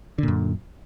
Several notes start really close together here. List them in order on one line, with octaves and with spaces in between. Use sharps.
D3 A#2 F#2